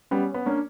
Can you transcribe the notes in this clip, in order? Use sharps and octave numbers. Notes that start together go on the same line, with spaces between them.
G3 B3 C#4
B3
A#3 C#4 D4